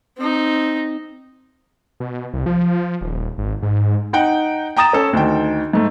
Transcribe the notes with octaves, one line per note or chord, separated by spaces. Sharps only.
C4 D#4
B2
C2
F3
D#1
G#1
G#2
D#4 F#5 G5
G5 A#5 D#6 A6 E7
C#4 A4
D2 D#3 G5
G#2 A3